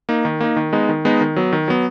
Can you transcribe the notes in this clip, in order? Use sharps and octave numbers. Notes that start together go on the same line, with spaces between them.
A#3 D#4
D#3
A#3 D#4
D#3
G#3 B3 D#4
D#3
G#3 B3 D#4
D#3
F#3 B3
D#3
F#3 B3